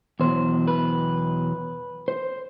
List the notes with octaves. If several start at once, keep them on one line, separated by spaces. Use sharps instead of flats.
E2 B2 F#3 C5
B4
C5